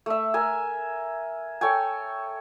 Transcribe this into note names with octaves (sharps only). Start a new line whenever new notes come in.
A3 E5
A#4 E5 G#5
A4 C#5 G5 G#5